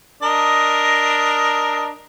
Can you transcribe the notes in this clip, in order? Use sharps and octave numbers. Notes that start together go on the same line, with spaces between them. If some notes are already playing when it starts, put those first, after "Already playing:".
D4 A#4 D#5